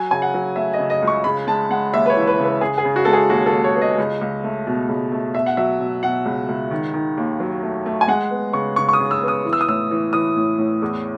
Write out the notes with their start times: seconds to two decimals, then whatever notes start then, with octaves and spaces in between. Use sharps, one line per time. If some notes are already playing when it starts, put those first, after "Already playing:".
Already playing: F#3 G#5
0.11 C#3 G#5
0.22 F#5
0.34 F#3
0.56 A3 E5
0.73 D#5
0.79 C#3
0.90 D#5
1.02 C#2
1.07 C#6
1.24 C#3 B5
1.47 G#3 A5
1.70 G#3 F#5
1.93 D#2 E5
2.06 B4
2.10 C#5
2.16 E3
2.27 B4
2.39 C#3 B4
2.61 C#3 G#4
2.78 G#4
2.85 C#3
2.96 F#4
3.05 G#3 A4
3.13 G#4
3.30 D#2 F#4
3.46 A4
3.52 D#2
3.64 C#5
3.75 B3
3.82 D#5
3.98 C#2
4.21 C#2
4.44 A3
4.67 B2
4.89 C#2
5.12 A3
5.34 B2 E5
5.46 F#5
5.57 F#3 E5
5.80 B2
6.03 B2 F#5
6.25 C#2
6.49 C#2
6.71 D#3
6.94 D#3
7.17 D#2
7.40 F#3
7.63 A3
7.86 A3
8.01 G#5
8.08 G#3 F#5
8.31 B3
8.53 C#3 C#6
8.76 C#3 C#6
8.89 C#6
8.93 D#6
9.00 C#3
9.11 E6
9.23 B3
9.28 D#6
9.45 E3
9.53 E6
9.61 D#6
9.68 A2 E6
9.91 E3
10.13 E3 D#6
10.36 A2
10.58 A2
10.82 E2